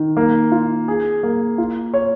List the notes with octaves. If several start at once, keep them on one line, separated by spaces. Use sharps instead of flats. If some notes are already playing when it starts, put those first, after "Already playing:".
Already playing: D#3
A#3
F4
G#4
A#3
F4
C#5